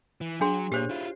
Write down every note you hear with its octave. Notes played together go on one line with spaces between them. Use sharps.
E3
F#3 D4 G#4 C6
A#2 G4 C5 C#5
E4 F4